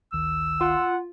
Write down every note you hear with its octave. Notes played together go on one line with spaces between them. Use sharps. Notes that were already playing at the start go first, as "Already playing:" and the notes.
G#1 D2 D#3 E6
F4 F#5